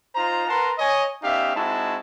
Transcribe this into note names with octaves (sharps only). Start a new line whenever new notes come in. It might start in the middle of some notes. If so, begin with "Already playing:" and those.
D#4 F4 C5 A#5
A#4 B4 F#5 A5 A#5 C6
C#5 D#5 G#5
B3 C#4 D#4 G4 E5 F5
G#3 C4 D#4 E4 F#4 A5